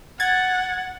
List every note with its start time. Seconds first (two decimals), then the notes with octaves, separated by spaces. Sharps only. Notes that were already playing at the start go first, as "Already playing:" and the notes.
0.20 F#5 G#6 A6